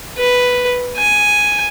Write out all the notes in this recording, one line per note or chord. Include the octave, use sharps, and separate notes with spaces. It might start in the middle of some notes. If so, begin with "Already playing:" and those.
B4
G#5